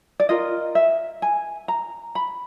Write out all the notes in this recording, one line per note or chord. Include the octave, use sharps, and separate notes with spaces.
D5
F4 A#4 D#5
E5
G#5
A#5
B5